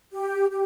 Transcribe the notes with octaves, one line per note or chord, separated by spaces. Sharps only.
G4
G4